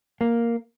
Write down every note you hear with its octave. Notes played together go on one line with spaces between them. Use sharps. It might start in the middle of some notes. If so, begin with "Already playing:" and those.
A#3